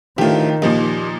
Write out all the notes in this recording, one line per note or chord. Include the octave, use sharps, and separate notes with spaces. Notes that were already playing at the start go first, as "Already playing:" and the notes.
D2 A2 D#3 F4 G4
D#2 A#2 F3 D#4